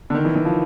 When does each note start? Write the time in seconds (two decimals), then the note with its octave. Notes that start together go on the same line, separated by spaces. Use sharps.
0.10 D3
0.15 D#3
0.25 E3
0.35 E3
0.45 F3